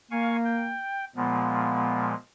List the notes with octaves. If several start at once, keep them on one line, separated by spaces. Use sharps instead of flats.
A#3 F5 G#5 C#6
G5
A#2 F3 G#3 B3